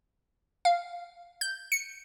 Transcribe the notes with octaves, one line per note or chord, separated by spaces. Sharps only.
F5
G6
C#7